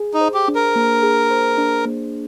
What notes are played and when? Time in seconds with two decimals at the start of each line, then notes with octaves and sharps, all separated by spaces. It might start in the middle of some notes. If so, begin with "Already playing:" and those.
Already playing: G#4
0.14 D#4
0.21 C5
0.34 G4
0.48 D4
0.55 A#4
0.76 A#3
1.03 G#4
1.30 C5
1.58 D4
1.85 A#3